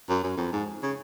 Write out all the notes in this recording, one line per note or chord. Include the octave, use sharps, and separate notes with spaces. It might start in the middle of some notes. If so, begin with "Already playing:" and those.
F#2
F#2
F2
G#2
C#3